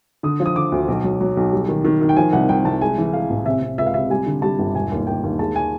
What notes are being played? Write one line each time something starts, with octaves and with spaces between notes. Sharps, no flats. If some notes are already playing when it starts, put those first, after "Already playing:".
D3 D#6
F3
D#6
D3 D6
D2
B1
F#3
F#3
B1
G3
D#3
D#3
D#3
G5
F3 G#5
C2 F#5
C2 G5
C2 A5
G#3 G#5
E3
G#3 F5
A1
C3 E5
C3
C#2 E5
F5
C3 E5
G3 G#5
D3
G3 A5
G1
E1 G#5
D#2
D#2 G5
D#2
G#3 A5
G#5